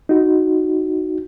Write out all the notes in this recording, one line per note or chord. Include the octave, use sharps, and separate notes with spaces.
D#4 F#4